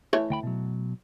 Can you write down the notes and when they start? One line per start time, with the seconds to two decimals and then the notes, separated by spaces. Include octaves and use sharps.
0.13 E3 A3 C#5
0.30 D2 G5 B5
0.43 B2 F#3